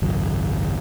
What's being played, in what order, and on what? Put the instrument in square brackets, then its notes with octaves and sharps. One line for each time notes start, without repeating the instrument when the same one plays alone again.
[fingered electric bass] G#1 C#2 F#2